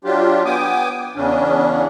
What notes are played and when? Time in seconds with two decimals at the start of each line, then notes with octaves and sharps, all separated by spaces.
0.04 F#3 D4 F4 G4
0.45 B3 G5 G#5 D6 D#6
1.16 E2 C#3 C#4 D4